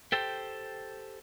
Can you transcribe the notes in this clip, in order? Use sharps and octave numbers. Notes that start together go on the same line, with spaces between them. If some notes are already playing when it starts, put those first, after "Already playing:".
G4 A4 C5 G5